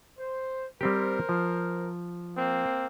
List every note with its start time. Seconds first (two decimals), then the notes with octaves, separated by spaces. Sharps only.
0.18 C5
0.81 G3 C4 G4 A#4 C5
1.29 F3
2.36 A#3 C4